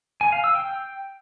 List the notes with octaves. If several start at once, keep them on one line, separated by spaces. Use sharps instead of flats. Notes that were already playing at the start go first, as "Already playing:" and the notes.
G#5
F5
E6
G5